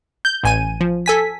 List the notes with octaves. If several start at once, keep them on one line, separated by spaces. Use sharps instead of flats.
G6
A1 G#5 D#7
F3
A4 G#5 B6